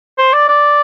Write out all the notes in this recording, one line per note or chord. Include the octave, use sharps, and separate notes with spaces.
C5
D5
D5